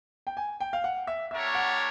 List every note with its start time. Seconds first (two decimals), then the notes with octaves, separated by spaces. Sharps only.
0.27 G5
0.37 G#5
0.60 G5
0.73 F5
0.84 F#5
1.07 E5
1.31 A3 D4 G4 A#4 C#5 E5
1.55 F#5